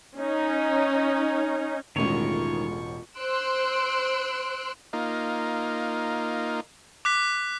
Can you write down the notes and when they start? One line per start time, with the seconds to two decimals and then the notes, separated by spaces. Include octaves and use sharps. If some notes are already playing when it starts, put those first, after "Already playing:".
0.18 C#4 D#4
1.96 E1 A1 D#3 G#3 A3 F4 C#5 C#6
3.18 C5 C6 E6 F#6 D7
4.93 A#3 D#4 F4
7.05 D6 F#6 B6